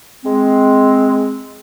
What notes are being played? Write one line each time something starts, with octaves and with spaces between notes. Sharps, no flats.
G#3 C4